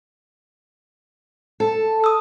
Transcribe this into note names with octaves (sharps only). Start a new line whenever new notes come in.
A4
D#6 E6